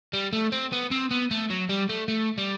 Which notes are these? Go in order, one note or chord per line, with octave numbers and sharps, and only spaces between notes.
G3
A3
C4
B3
C4
B3
A3
F#3
G3
A3
A3
G3